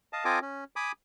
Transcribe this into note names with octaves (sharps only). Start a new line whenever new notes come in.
D#5 F5 A5
C4 F4 A4 D#5 G#5 D6
C#4
G#5 B5 D6 D#6